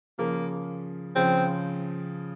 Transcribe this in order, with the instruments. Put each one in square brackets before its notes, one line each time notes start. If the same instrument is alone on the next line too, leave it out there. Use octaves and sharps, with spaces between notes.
[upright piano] C#3 F3 [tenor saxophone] A#3
[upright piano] C#3 F3 [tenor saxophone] C4